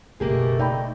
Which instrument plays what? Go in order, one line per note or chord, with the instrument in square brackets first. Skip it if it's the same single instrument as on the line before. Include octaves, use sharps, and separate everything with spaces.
[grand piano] F#1 [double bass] B2 [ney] A3 [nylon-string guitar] A#3 G4 G#4
[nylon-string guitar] D#4 [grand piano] D5 G5 B5